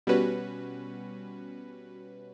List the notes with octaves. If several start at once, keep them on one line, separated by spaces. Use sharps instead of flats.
B2 G3 C#4 F#4 B4